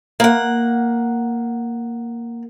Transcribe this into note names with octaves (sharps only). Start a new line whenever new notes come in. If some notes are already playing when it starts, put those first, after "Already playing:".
A#3 F#5